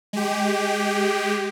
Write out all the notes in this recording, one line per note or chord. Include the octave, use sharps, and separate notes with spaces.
G#3 G4